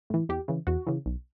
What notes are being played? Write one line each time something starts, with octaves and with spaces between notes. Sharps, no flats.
A2 E3
E2 G4
C#3 E3
E2 F#4
C#3 E3
B1